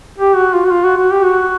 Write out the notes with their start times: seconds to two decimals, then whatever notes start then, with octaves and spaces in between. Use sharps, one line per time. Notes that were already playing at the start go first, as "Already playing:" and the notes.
0.18 G4
0.36 F#4
0.53 F4
0.66 F#4
0.71 F4
0.85 F#4
0.97 F#4
1.11 G4
1.24 F#4